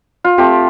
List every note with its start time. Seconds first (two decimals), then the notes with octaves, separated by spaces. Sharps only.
0.24 F4
0.38 A3 C4 F4 G4